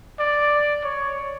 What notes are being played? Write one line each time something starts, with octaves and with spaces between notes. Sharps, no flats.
D5
C#5